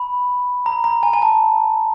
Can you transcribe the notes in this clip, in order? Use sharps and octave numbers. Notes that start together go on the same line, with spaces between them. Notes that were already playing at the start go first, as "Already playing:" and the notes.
Already playing: B5
A#5
A#5
G#5
G#5
A5